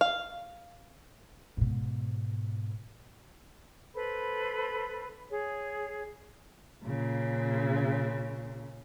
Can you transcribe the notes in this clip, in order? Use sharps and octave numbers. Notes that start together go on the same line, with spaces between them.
F5
G#2 B2
A4 B4 C5 B5
G#4 C#5
A#2 C#3